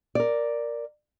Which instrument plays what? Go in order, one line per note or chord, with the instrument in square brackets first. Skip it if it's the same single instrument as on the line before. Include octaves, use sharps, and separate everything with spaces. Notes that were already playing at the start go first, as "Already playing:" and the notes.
[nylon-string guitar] A#4 D5